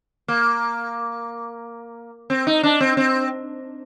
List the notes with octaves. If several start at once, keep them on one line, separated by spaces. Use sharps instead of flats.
A#3
C4
D#4
D4
C4
C4